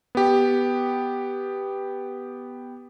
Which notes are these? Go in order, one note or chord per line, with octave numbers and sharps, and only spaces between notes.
B3 G4